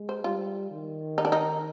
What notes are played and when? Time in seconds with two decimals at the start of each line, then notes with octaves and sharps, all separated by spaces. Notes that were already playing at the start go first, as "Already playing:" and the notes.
Already playing: G#3
0.09 C5
0.24 G3 F4
0.71 D#3
1.18 D#4
1.25 D4
1.32 D#4